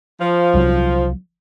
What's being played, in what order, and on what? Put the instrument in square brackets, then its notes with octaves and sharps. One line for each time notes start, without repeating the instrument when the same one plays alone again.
[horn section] F3
[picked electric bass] C2 F#3